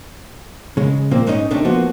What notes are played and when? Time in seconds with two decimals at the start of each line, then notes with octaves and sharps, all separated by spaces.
0.77 C#3 G#3
1.11 A#2 F3 A#3 C4
1.27 G#2 G#3 C#4 D#4 D#5
1.51 C3 A3 D4 D#4
1.65 F3 A#3 B3 F#4